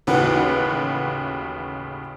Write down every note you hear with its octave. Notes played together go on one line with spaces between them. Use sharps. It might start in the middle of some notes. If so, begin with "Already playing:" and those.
A1 D#2 C#3 F#4 B4